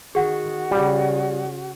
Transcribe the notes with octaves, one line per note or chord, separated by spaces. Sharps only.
D#3 F#4 G#4 F#5
C#3 G3